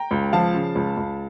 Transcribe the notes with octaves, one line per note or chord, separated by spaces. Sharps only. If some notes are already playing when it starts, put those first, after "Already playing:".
Already playing: G5 A#5
C#2
F3 F5 A5
C#3
C#2
C#2